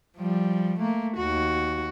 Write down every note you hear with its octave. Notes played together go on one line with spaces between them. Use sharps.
F3 G3
A3 A#3
D#2 F#4